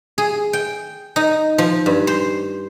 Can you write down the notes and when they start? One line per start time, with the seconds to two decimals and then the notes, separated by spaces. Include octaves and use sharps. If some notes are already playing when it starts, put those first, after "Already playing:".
0.18 G#4
0.53 G5
1.16 D#4
1.58 F3
1.86 G2
2.07 C5